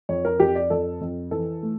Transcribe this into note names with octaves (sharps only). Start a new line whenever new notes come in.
F2 C#5
A#4
F2 G4
D5
F2 A4
F2
E3 A4
A3